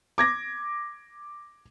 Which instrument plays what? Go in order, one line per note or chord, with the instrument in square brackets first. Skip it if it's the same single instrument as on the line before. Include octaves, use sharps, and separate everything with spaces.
[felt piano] D6 G#6 A#6